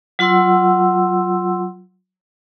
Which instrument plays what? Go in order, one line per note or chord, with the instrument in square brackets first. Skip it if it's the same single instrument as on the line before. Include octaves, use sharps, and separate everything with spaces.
[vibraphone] F#3 F4 F#5 C6 E6